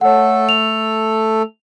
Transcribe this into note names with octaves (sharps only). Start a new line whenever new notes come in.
A3 A4 C#5 F#5
F7